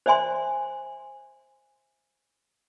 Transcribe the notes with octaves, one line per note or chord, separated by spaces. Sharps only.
C5 D5 E5 G#5 C6